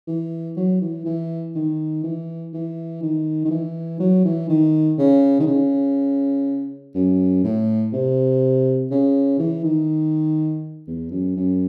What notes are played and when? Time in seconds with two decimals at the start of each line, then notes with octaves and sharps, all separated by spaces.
0.07 E3
0.56 F#3
0.81 E3
1.05 E3
1.55 D#3
2.04 E3
2.54 E3
3.03 D#3
3.45 D#3
3.51 E3
4.00 F#3
4.25 E3
4.49 D#3
4.98 C#3
5.40 D#3
5.47 C#3
6.95 F#2
7.44 A2
7.93 C3
8.91 C#3
9.39 E3
9.64 D#3
10.87 E2
11.11 F#2
11.36 F#2